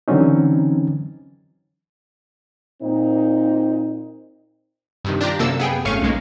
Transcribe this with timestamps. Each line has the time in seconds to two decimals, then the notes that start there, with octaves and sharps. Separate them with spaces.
0.08 D3 E3 F#3 C4 C#4 D#4
2.82 A#2 C4 D#4
5.04 G2 C3 D#3
5.21 D4 F4 G4 A#5
5.39 F#2 C3 A#3 A4 E6
5.59 B3 G#4 G5
5.85 G#1 A3 C#4 F5 C#6 D#7
6.02 B1 G#3 A#3